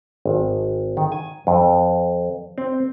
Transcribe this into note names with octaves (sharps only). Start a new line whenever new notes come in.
G#1
D#3
G#5
F2
C4